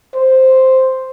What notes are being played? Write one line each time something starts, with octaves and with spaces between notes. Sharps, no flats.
C5